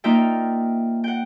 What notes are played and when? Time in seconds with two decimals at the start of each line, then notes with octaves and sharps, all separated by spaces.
0.04 A#3 D#4 F4 D5 E5 G5
1.04 F#5 G5